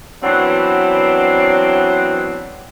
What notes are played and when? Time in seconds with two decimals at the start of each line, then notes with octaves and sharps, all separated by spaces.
0.22 E3 F#3 B3 C4 D4